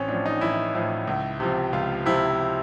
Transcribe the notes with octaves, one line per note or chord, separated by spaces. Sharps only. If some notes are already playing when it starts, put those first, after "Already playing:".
Already playing: A1 C4 C#4
A2 F3 D4
D#4
A1 E4
A2 F3
C#2
C3 F3
C#2 F4
C3 F3 E4